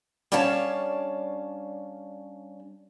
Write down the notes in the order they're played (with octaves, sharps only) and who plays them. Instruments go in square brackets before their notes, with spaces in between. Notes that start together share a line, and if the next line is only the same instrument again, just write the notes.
[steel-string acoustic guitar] G3 C#4 D4 C#5 F5 A5